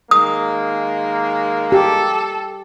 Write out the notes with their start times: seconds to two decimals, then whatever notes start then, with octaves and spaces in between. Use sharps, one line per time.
0.11 D#3 G#3 A#3 D#6
1.72 G4 A4